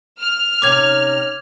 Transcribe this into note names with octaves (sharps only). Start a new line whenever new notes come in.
F6
C3 C#4 D#4 D6 G#6